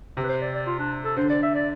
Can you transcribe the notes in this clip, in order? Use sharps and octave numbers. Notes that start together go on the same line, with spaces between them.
C3
B4
C5
D5
D5
F4
D4
A4
D3 C5
D5
E5
D5